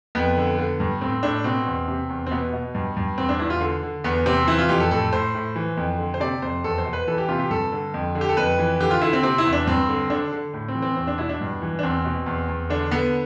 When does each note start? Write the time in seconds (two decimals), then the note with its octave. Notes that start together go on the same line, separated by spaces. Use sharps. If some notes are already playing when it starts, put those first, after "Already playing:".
0.15 F2 B3
0.37 D3
0.59 D3
0.80 G2
1.01 A2 C4
1.23 A2 D4
1.44 B2 C4
1.66 E2
1.88 C3
2.09 E2
2.26 C4
2.31 B2 B3
2.53 B2
2.75 G2
2.97 G2
3.17 E2 C4
3.29 D4
3.39 E2 E4
3.50 F4
3.61 D3
3.83 D3
4.04 E2 B3
4.26 C3 C4
4.47 E3 E4
4.58 F4
4.69 F2 G4
4.80 A4
4.91 A2 A4
5.12 A2 C5
5.35 A2
5.56 E3
5.77 F2
5.99 D3
6.14 C5
6.20 C3 D5
6.42 F2 C5
6.64 E2 A4
6.78 C5
6.86 B2
6.93 B4
7.07 E3 A4
7.18 G4
7.29 C3 F4
7.40 G4
7.50 G2 A4
7.72 D3
7.94 F2
8.15 D3
8.21 G4
8.29 A4
8.37 F2 B4
8.59 E3
8.81 D3 G4
8.91 F4
9.02 D3 E4
9.13 C4
9.23 C3 C4
9.38 E4
9.45 E2
9.53 D4
9.67 G2 C4
9.89 D3
10.10 D3 D4
10.32 D3
10.53 A2
10.68 C4
10.75 E3
10.82 C4
10.96 E2 C4
11.07 D4
11.18 B2 E4
11.29 D4
11.41 G2
11.62 E3
11.79 D4
11.83 E2 C4
12.05 B2
12.26 E2
12.48 E2
12.70 D3 D4
12.92 D3 B3